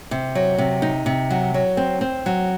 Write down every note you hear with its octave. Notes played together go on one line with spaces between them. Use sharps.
C3
F#3
C3
D#4
C3
F#3
F#3
C4
C4
F#3